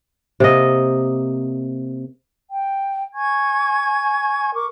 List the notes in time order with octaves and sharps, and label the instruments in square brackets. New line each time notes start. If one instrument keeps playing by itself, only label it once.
[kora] C3 A#3 D#5
[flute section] G5
G#5 C#6 G#6
A#4 C#6 D6